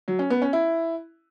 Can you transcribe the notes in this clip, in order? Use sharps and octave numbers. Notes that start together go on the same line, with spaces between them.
F#3
C#4
B3
C#4
E4